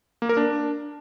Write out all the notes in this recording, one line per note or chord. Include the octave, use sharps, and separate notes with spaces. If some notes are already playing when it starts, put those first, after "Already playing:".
A#3
A#4
D4